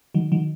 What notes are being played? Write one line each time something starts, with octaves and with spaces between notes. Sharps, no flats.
D#3 F#3
D#3 F#3